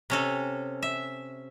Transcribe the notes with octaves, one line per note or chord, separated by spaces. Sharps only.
C3 C#4 A4
E5